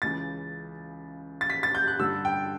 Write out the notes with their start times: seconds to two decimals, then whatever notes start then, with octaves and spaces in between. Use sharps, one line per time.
0.02 C#2 C#3 E3 A6
1.41 A6
1.50 B6
1.63 A6
1.75 G6
1.88 F#6
1.99 G2 D3 E6
2.25 G5